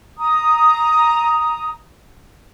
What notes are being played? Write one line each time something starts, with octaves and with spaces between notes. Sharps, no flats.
A#5 D#6